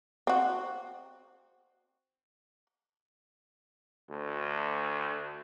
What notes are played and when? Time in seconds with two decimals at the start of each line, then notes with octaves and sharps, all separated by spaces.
0.27 C4 F#4
4.10 D2